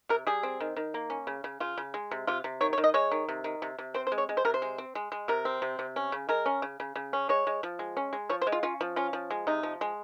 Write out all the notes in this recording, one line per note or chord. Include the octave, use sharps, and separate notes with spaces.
C3 A#4
G3 G#4
C4
D#3
D#3
A#3
C#4
C#3
C#3
C#3 F4
C#3
G#3
C3
C3 F4
C3
D#3 C#5
C#5
D#3
D#5
G#3 C#5
D#3
C3
D#3
C3
C3
C4 C5
C5
G#3
C#5
G#3
C5
C3 A#4
C5
G#3
C4
G#3
G#3
C3 A#4
C4
C3
C3
C#4
C#3
G#3 A#4
C#4
C#3
C#3
C#3
C#4
G#3 C#5
G#3
F3
G#3
C#4
G#3
F3 C#5
C5
G#3
F4
C#4 F4
F3
C#4 F4
F3
G#3
C3 D#4
F3
G#3